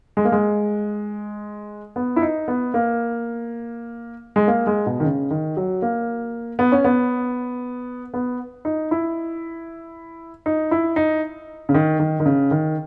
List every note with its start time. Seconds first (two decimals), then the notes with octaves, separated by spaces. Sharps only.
0.17 G#3
0.25 A#3
0.32 G#3
1.96 B3
2.16 E4
2.22 D#4
2.48 B3
2.74 A#3
4.36 G#3
4.48 A#3
4.67 G#3
4.86 B2
5.00 D#3
5.05 C#3
5.31 D#3
5.57 F#3
5.82 A#3
6.59 B3
6.72 C#4
6.84 B3
8.14 B3
8.65 D#4
8.91 E4
10.46 D#4
10.71 E4
10.96 D#4
11.69 C#3
11.74 D#3
12.00 D#3
12.20 D#3
12.26 C#3
12.51 D#3